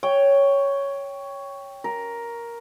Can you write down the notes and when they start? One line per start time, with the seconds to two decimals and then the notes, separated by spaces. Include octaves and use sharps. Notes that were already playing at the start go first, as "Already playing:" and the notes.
0.03 C#5 G5
1.84 A#4